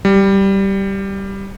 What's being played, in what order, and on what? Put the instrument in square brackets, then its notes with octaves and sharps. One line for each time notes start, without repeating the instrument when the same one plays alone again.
[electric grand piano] G3